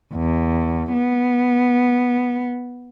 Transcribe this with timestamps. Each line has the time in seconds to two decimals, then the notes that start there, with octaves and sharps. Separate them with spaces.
0.14 E2
0.93 B3